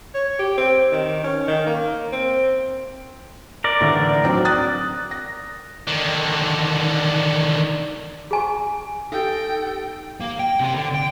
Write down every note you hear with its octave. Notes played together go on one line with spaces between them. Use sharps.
C#5
G4
C4
D#3
C#4
D#3
A#3
C4
A#4 D5
A2 D3 E3
F#3 C4 D4
D#6 F#6 A6
A#6
D3 D#3
G#4 G#5 C#6
D#4 G4 A4 G5
A#3
G5
C3 G5
D3
G5